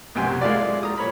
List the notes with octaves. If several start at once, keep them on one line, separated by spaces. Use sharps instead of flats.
B1 F#2 C3 G5 G#5 C6
G#3 E4 F4 D5
A#5 D#6
A#2 C#5 B5